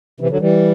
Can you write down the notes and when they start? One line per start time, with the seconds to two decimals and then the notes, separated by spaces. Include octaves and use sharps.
0.20 C3 E3
0.30 D3 F#3
0.40 E3 G3